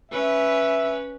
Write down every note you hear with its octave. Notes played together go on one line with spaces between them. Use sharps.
C#4 B4 E5